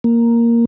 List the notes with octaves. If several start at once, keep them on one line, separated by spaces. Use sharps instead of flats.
A#3